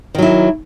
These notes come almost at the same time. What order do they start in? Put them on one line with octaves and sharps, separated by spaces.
D#3 F#3 E4